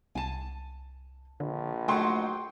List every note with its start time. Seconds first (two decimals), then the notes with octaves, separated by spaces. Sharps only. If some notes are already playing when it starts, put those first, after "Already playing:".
0.15 C2 G#5 A5
1.40 A#1 D3
1.88 F#3 A3 D#4 G5 C6 C#6